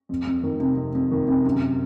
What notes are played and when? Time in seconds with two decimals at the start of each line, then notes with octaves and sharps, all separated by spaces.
0.09 F2
0.27 F2
0.43 D#3
0.60 C3
0.77 F2
0.95 F2
1.11 D#3
1.28 C3
1.44 F#2